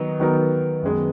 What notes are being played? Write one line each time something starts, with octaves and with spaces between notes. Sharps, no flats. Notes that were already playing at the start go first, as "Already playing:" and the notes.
Already playing: D#3 F#3 B3 D#4
D#3 F#3 B3 D#4 A#4
F#2 D#3 G#3 B3